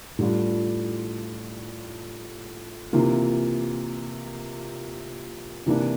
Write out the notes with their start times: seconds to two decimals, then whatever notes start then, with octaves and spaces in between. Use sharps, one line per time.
0.19 A2 G3 D4 F4
2.93 C3 E3 A#3 F4
5.66 C3 E3 A#3 D4